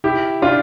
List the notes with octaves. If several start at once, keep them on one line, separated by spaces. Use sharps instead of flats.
E4 G4
D4 F4